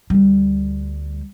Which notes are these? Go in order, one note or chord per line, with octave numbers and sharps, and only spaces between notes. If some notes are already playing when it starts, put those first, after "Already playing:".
D2 G3